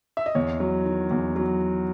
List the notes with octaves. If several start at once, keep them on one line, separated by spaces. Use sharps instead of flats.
E5
D#5
E2 C#5
F#3
D#3
E2
F#3